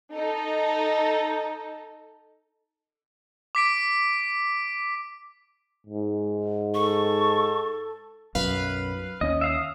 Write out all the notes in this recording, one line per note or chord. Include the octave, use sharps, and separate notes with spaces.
D#4 A4
D6 B6 D7
G#2
A4 C#6
B1 F#2 B4 F5
D#2 C#4 D#5
E5 F5 D#6